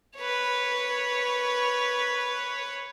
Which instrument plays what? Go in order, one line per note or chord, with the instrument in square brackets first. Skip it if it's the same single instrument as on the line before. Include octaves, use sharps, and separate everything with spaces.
[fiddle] B4 C#5